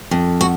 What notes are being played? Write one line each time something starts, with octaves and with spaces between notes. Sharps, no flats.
F2
F#4